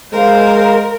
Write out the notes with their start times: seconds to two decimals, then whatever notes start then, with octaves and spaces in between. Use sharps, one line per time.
0.13 G#3 A#4 C5 F5